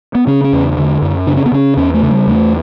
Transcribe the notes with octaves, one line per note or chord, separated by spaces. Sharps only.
B3
C#3 C#4
C#4
E2
D3
F#2
C#3 D4
C#4
B3
C#3 C#4
E2 C#4
A3
C#3
G3
E2 A3